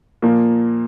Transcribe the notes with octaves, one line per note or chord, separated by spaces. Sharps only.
A#2 F3 A#3